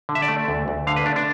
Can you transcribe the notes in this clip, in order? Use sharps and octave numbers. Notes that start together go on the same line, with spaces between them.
D3
E5
D5
A3
D2
D2
D3 F5
B4
A3 D4
D4